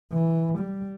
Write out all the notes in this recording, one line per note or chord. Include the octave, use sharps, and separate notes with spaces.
E3
G3